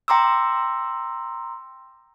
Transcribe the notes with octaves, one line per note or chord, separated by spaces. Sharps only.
G5 A#5 C6 D6 E6